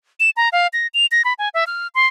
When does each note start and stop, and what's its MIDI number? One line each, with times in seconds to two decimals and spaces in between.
0.20 0.30 100
0.37 0.49 82
0.52 0.67 77
0.73 0.87 94
0.94 1.06 101
1.12 1.22 94
1.25 1.33 83
1.39 1.49 80
1.54 1.64 76
1.67 1.88 89
1.95 2.07 84